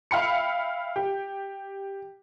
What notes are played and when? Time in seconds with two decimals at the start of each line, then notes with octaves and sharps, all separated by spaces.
0.11 E5 F5 G5 B5 C#7
0.96 G4